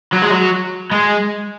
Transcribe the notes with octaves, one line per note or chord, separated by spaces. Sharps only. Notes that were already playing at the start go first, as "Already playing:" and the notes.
F#3
G#3
F#3
G#3